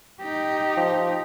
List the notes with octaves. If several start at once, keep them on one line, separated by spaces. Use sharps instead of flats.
D#4 G4
F3